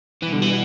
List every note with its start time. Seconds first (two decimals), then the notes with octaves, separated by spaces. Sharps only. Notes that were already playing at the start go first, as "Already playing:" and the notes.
0.22 B2 E3 G3 B3
0.32 D3
0.42 E3